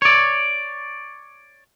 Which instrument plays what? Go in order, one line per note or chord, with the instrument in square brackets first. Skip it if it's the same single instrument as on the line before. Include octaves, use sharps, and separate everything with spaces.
[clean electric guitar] C#5 D5